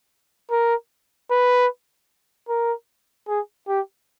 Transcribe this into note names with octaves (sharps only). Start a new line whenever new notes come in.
A#4
B4
A#4
G#4
G4